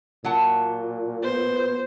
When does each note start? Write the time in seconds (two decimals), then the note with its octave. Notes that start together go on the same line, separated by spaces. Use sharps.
0.25 A#2 F#3 F#5 A5
1.24 B3 C5